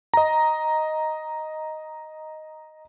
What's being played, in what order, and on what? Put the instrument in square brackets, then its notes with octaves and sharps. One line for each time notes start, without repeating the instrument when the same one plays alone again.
[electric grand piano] D#5 A#5